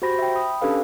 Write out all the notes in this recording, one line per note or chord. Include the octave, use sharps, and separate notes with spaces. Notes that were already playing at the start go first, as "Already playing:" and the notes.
F#4 G4 C5 B5 A#6
E5 G5
B5 D#6
C#4 D4 G4 A4 B4 F5